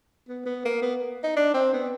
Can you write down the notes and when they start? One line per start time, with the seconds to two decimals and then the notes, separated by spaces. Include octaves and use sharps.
0.29 B3
0.46 B3
0.65 A#3
0.83 B3
1.24 D#4
1.37 D4
1.54 C4
1.73 B3